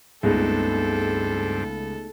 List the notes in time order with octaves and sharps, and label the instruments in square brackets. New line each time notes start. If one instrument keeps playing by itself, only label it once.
[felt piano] C#2 [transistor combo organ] G2 C4 [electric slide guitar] A3 B3 D#4 [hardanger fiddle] A4